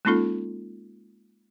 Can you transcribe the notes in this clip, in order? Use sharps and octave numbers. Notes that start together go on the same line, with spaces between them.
G#3 A#3 C#4 D#4 F4 A4